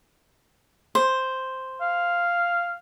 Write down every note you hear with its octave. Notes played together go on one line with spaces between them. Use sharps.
C5
F5